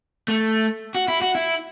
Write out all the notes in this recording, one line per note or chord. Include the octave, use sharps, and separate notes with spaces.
A3
F#4
E4
F#4
E4